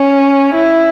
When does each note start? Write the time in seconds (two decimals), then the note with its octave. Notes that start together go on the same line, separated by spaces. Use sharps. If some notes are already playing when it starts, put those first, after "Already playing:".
Already playing: C#4
0.55 E4